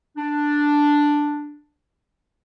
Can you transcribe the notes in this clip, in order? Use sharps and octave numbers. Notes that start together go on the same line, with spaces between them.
D4